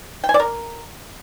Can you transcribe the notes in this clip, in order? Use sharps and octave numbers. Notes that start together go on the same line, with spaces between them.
G5
G#5
D5
A#4